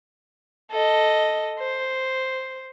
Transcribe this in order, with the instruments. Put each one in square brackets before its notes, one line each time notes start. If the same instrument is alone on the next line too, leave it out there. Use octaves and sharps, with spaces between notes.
[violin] A4 D#5
C5